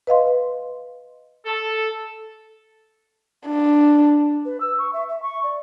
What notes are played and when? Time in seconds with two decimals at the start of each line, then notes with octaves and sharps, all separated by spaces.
0.07 B4 D#5 F5 C6
1.46 A4
3.47 D4
4.45 B4
4.61 E6
4.79 C#6
4.93 E5
5.09 E5
5.23 C#6
5.43 D5